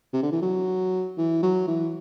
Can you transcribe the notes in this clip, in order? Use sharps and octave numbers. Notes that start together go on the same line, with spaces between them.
C3
D3
E3
F#3
E3
F#3
E3